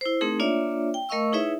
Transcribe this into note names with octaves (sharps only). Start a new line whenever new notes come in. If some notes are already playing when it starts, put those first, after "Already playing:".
E4 C5
A3 C4 D#4 G#4 A#4
A#3 D4 F4 C#5 D5 E5
G5
A3 A#4 D#5 F5 C#6 E6
D#4 E4 G#4 B4 C#5 E5